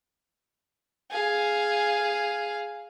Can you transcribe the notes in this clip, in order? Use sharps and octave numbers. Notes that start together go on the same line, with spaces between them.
G#4 F5